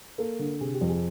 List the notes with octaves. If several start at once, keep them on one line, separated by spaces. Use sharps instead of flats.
A#3 A4
D3
C3 G#4
G4
F2
G#4